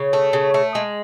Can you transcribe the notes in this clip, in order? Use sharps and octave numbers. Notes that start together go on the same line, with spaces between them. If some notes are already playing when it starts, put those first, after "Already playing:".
Already playing: C#3 C#5
A3
C#3
A3
G#3